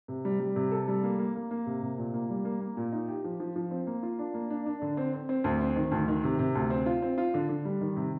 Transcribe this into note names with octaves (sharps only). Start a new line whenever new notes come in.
C3
G3
G3
C3
A4
G3
A#3
A#3
A#3
A#3
C3
C3
A#2
A#3
G3
A#3
A#3
A#2
D#4
G4
F3
F3
F3
C4
A#3
F4
D4
A#3
D4
D4
D3
C4
C4
C4
D2
C4
D#3
D2
D#3
C3
C3
D2
C4
F4
C4
F4
D3
D3
G3
D#3
C3